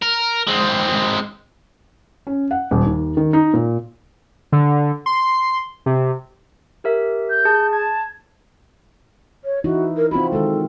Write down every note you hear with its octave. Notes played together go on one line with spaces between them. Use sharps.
A#4
G#3 C4
C#4
F#5
D#1
D#2
D#3
D#4
A#2
D3
C6
C3
G4 A#4 E5
G6
G#4 A5
A5 G#6
C#5
E3 D#4 E4 F#4
A#4
C4 F4 F#4 B5
D#3 G#3 A4